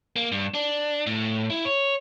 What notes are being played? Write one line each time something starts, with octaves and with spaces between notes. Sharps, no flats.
A#3
G2
D4
A2
E4
C#5